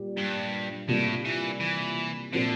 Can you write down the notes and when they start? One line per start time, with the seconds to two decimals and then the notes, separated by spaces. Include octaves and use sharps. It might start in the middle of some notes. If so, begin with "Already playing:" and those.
Already playing: A#2 G3 G4
0.17 G2
0.88 A2 C3 G3 A#3 D4 F4
1.25 E3
1.60 E3
2.33 A#2 D3 F3 C4